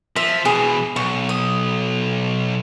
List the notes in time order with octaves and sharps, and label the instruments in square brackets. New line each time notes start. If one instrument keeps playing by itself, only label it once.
[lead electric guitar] F3 [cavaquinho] E5
[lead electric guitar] B2 E3 [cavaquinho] G#4
[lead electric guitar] B1 [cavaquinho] C#6
[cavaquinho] D#6